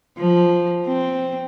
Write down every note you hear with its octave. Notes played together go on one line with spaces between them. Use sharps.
F3
C4